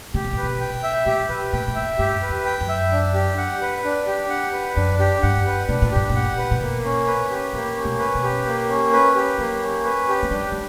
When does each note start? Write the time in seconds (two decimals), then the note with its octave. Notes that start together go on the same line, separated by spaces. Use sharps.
0.14 C#3 G4
0.24 B2
0.33 A#2
0.38 B2 B4
0.61 G5
0.83 E5
1.06 A#2 G4
1.29 A#2 B4
1.53 A#2 G5
1.68 B2
1.75 A#2 E5
1.98 G2 G4
2.22 B4
2.29 E2
2.45 G5
2.61 F#2
2.69 E5
2.92 D4
3.14 G4
3.38 F#5
3.61 B4
3.84 D4
4.07 G4
4.30 F#5
4.53 B4
4.76 F#2 D4
4.99 G4
5.23 G2 F#5
5.46 B4
5.69 B2 D4
5.82 A#2
5.92 G2 G4
6.10 A#2
6.16 F#5
6.37 B4
6.51 A#2
6.61 B2 A#3
6.85 C#4
7.07 B4
7.31 G4
7.53 A#2 A#3
7.76 C#4
7.85 B2
7.99 B4
8.15 B2
8.23 G4
8.46 A#3
8.69 C#4
8.93 B4
9.15 G4
9.38 F#3 A#3
9.61 C#4
9.84 B4
10.08 G4
10.23 A#3
10.31 G3 D4
10.52 G3